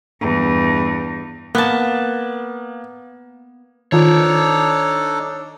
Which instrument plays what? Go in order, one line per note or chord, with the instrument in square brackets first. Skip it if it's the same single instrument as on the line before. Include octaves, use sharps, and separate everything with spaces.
[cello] E2 G2
[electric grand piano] A#3 [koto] B3 A5
[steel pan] D#3 F4 [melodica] D4 D#4 A4 [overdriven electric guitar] C#5 D5